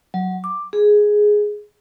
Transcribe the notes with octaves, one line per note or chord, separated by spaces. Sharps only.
F#3
D6
G#4